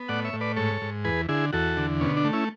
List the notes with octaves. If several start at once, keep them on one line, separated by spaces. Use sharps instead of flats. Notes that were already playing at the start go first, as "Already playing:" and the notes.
Already playing: B3
A2 D5 F#5
C#5 E5
A2
B4 D5
G#2 A4 C#5
G#2
E2 G#4 B4
D3 E4 G#4
E2 F#4 A4
D3
B2 C#4
D4
A3
C#4 E4